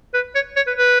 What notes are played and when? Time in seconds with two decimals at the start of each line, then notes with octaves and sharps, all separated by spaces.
0.14 B4
0.35 C#5
0.57 C#5
0.67 B4
0.78 B4